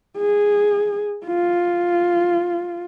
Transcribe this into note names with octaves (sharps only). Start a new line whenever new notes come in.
G#4
F4